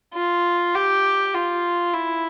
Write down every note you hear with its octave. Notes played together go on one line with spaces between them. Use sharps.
F4
G4
F4
E4